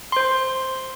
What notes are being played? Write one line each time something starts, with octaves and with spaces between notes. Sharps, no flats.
C5 C6